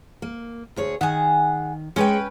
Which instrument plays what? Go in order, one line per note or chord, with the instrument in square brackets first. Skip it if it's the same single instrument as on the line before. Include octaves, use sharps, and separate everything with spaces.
[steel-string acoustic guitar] A#3
D2 G#4 C#5
[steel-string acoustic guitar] D#3 [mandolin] G#4 F#5
[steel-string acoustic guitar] G#3 C#5 [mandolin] C#4 B4 G5